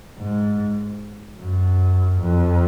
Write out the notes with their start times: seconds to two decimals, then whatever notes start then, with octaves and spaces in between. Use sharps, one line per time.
0.18 G#2
1.39 F#2
2.20 F2